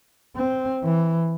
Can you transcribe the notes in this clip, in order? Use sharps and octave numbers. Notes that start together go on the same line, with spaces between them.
C4
E3